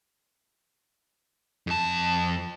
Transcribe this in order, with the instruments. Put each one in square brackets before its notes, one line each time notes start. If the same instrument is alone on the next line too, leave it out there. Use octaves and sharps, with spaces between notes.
[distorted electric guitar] F2 A5